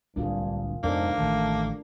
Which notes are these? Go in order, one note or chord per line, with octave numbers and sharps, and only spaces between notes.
D1 C2 G2 A#3 D4 F4 G#4
F2 G#2 C3 A#3 B3 D4 A4 A#4
A1 D#3 A3